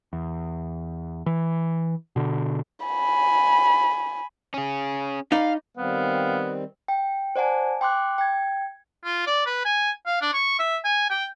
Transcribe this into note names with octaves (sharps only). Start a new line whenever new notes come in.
E2
E3
B2 D3
G#5 B5
C#4 G#4
D#4 B4 D5 F5
D#3 G3 B3 C4 F5
G5
C5 D5 F#5 G#5 A5
G5 C6 D6 F#6
G5 G#6
F4
D5
B4
G#5
F5
D4
C#6
E5
G#5
G5